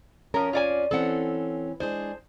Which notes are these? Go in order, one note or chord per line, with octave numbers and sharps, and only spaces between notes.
F2 F3 C#4 A#4
F4 D5 G#5
E3 C4 C#4 A4 F#5
G#3 D4 G#4 C5